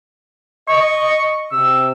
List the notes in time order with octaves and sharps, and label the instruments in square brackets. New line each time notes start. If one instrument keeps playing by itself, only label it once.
[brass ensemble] D#5 [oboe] C#6
[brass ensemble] C3 [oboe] E6